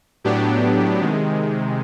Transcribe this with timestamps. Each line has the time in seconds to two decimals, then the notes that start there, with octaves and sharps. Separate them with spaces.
0.24 A2 F#3 B3 D4 G4
1.00 C3 D#3 G#3